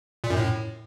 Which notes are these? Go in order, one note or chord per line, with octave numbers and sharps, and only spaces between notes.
A#2
F#2
A2